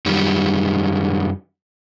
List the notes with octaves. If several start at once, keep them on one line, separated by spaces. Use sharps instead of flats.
F#2 D#3 G3